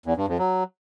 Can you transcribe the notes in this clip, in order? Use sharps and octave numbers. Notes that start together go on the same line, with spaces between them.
E2
G2
F2
F#3